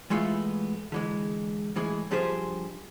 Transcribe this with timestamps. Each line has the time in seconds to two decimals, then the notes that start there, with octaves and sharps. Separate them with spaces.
0.10 E3 G#3 A3 B3 F4
0.92 D3 E3 G#3
1.76 A2 E3 G#3 G#4
2.11 G2 F3 G4 G#4 C5